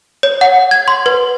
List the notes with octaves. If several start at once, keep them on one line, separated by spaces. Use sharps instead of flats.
C#5
F#5
G#6
C6
B4